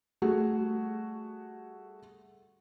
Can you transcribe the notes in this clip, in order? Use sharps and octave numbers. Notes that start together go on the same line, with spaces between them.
G3 A3 F#4 G#4